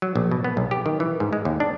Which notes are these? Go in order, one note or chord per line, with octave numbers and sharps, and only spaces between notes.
F#3
A#1
B2
B3
B1
G4
D#3
E3
G#2
G#3
D#2
D4